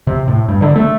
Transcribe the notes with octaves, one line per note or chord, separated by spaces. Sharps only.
C3
A2
G2
D3
A3